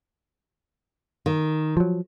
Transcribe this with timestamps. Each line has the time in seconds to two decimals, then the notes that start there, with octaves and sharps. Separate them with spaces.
1.26 D#3
1.77 F3 F#3